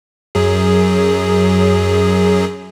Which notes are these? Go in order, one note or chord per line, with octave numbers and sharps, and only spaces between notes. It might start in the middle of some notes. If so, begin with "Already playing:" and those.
F#2 F#3 G#4